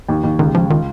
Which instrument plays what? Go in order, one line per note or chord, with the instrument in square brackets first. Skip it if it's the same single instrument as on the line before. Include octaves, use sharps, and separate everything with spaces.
[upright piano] D#2
D#2
[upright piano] C#2 [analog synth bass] D#3
[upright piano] C#2 [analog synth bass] F3
[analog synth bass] D#3 [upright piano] F4